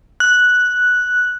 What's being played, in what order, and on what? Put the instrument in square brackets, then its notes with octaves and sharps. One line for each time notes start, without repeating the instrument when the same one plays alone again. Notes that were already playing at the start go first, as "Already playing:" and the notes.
[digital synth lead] F#6